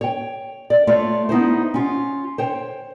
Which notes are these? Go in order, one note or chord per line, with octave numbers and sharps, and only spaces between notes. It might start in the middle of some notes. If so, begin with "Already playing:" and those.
C#5 G5
D5
A3 F4 C#5 D5
B3 D#4 E4 C5
C#4 F4
C5 C#5 G5